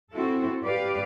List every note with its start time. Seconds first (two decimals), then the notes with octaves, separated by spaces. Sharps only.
0.11 C4 E4 F#4 A4
0.65 G4 B4 D5 F5